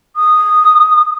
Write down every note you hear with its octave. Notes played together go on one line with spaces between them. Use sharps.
D#6